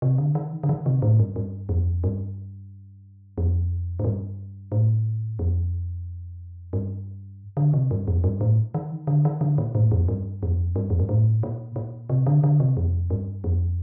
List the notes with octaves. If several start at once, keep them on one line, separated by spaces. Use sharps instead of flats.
C3
D3
D#3
D3
D#3
C3
A2
G2
G2
F2
G2
F2
A2
G2
A2
F2
G2
D3
C3
G2
F2
G2
A2
D#3
D3
D#3
D3
A#2
A2
F2
G2
F2
G2
F2
G2
A2
A#2
A#2
C3
D3
D3
C3
F2
G2
F2